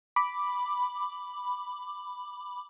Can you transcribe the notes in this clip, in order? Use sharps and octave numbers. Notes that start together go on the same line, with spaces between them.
B5 D6